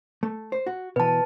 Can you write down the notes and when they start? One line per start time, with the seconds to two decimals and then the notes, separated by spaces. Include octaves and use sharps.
0.23 A3
0.52 C5
0.66 F#4
0.96 B2 E3 B4 A5